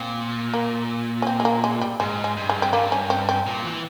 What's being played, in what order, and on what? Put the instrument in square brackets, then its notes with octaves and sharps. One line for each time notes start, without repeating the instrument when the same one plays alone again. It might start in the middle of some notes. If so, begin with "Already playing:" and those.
Already playing: [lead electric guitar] A#2 [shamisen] C4
[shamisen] A#3
C#4
C4
G#3
A#3
G#3
G3
[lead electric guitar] G#2 [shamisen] G#3
[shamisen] G#3
[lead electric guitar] G2
[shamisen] G#3
C4
[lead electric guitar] G2 [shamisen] A#3
[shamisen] C#4
C4
C4
[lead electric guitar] A#2
E3